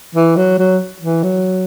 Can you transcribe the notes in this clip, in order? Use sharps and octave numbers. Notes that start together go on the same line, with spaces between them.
E3
F#3
F#3
E3
F#3